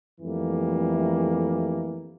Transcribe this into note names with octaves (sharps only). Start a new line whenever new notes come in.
F2 E3 G3 A3 A#3